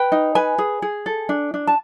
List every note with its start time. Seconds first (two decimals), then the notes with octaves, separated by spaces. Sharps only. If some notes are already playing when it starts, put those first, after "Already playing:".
Already playing: B4 G5
0.12 D#4
0.35 B4 G#5
0.58 G#4
0.82 G#4
1.06 A4
1.29 D4
1.54 D4
1.67 A5